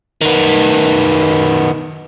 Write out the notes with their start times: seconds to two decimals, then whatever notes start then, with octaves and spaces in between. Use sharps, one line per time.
0.21 D#3 B3